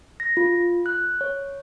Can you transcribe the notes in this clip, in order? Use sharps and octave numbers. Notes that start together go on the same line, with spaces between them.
A#6
F4
F#6
C#5